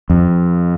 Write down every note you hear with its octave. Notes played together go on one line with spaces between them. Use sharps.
F2